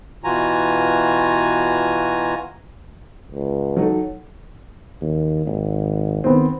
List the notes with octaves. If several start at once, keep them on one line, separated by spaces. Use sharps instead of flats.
B2 E3 F4 F#4 G#5 A#5
C#2
F#3 D#4 A4
D#2
G#1
D#3 B3 C4